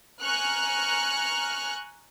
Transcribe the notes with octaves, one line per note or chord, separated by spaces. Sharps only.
G#5 A#5 C#6 F6 F#6